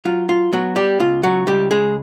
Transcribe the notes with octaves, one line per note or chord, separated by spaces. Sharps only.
F#3 F4
F4
F#3 B3 F#4
G3 G4
C#2 F4
F#3 F#4
C#2 G3 G4
G#3 G#4